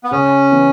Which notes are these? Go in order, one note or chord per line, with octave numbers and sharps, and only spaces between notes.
B3
C#3 C#4
E3 B3